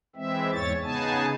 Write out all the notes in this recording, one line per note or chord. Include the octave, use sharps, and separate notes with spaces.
E3 G#3 C4 E5
E2 G#2 C#5 A6
C#3 B3 D#4 G#4 G#5 A5